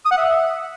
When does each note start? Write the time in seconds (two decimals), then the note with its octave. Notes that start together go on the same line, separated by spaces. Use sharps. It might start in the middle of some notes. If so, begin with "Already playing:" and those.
0.05 D#6
0.11 F#5
0.18 E5